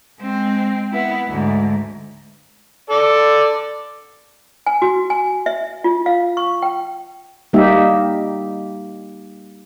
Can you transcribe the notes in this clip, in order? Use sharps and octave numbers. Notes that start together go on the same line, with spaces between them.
G#3 C4
B3 E4
D2 G#2
A4 D5
G#5
F#4
G#5
E5
F4
F5
C#6
G5
G3 A#3 D#4 G4 E5